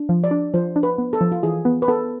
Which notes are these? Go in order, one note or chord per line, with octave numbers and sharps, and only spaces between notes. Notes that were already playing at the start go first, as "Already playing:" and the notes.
Already playing: D4
F3
D5
D4
F3 C5
D4
B4
B3
A4
F3
F4
E3 G#4
B3
B4
B3 A4